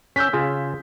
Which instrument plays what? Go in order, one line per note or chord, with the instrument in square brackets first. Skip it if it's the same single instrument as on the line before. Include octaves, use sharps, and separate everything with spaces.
[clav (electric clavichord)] C#4 [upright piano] E6 G6 B6
[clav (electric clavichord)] C#3 F4 G#4